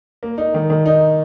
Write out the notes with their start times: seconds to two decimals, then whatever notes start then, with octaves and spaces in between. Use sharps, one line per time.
0.23 A#3
0.38 D#4
0.54 D#3
0.70 D#3
0.86 D#4